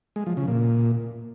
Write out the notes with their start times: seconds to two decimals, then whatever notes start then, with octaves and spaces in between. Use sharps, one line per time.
0.16 G#3
0.27 F3
0.37 C#3
0.48 A#2